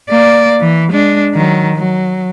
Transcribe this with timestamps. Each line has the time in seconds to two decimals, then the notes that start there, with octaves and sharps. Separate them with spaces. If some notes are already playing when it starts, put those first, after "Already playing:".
0.11 A#3 D5
0.61 E3
0.92 G#3 D4
1.35 D#3 F#3
1.76 F#3